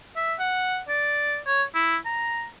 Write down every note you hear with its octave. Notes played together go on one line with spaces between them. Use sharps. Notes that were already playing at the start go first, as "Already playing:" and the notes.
E5
F#5
D5
C#5
E4
A#5